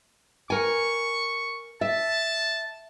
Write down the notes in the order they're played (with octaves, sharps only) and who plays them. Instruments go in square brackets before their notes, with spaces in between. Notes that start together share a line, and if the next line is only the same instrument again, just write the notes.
[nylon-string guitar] A#4 G#5 [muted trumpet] C#6
[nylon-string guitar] E5 [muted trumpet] A5